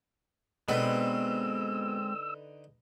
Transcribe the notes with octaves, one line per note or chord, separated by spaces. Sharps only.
B2 D3 G#3 B3 C4 D#4 B4 E6